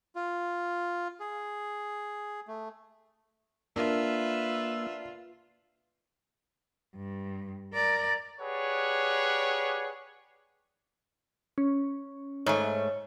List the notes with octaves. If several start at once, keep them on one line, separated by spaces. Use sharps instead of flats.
F4
G#4
A3
A#3 D4 F4 A#4 B4 E5 E6
G2
A#4 D5
G4 G#4 B4 C#5 D5 F#5
C#4
G#2 A3 C#5